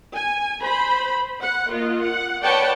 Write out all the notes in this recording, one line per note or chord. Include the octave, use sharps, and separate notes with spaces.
G#5
C5 B5
F#5
A#3 F4 D#5
F#5
B4 C#5 D5 F#5 G5 A5